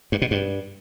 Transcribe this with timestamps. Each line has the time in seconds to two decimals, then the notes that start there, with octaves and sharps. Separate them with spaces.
0.12 G2
0.22 B2
0.31 G2